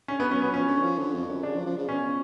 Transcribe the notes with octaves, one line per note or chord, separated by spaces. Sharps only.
D3 C#4
B3
F#3 C#4
B3
F3 C#4
D3
F3
D3
F2
F#2
C#3 D4
F3
F3
C#3
B2 C#4